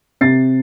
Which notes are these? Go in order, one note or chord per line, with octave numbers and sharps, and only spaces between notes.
C3 A6 C7